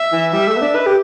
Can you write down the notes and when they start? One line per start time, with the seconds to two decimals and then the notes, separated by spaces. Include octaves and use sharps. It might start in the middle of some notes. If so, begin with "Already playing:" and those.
Already playing: E5
0.12 E3
0.33 G3 E5
0.48 A3
0.57 B3
0.61 D4
0.75 B4
0.86 G4